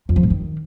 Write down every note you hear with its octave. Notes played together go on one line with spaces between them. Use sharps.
F2
F3
A2
D#3